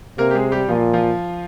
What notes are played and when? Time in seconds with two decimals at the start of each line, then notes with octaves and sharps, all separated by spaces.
0.18 C3 A#3 A#4
0.31 G4
0.35 G#3 G#4
0.52 G3 G4
0.69 A#2 F3 F4
0.94 F3 F4